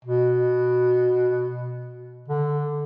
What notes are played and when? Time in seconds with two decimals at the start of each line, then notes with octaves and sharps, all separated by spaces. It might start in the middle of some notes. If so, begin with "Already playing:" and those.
0.05 B2
2.28 D3